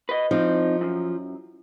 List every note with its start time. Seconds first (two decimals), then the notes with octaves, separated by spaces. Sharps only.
0.09 B4 D#5
0.31 F3 C4 D#4
0.81 F#2